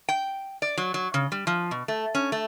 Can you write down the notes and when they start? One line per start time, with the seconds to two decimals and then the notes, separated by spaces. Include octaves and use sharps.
0.09 G5
0.62 D5
0.78 F#3
0.94 F#3
1.14 C#3
1.32 G3
1.47 F3
1.71 B2
1.88 A3
2.15 C#4
2.32 A3